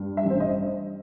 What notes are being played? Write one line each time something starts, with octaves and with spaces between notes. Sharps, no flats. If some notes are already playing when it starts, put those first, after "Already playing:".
Already playing: G2
E5
A1
C5
D#5